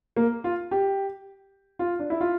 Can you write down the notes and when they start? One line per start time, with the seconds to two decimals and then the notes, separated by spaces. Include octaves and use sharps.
0.16 A#3
0.44 F4
0.71 G4
1.79 F4
1.99 D4
2.10 E4
2.20 F4